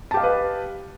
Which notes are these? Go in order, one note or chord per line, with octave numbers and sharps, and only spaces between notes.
G4 B4 D#5 F5 A5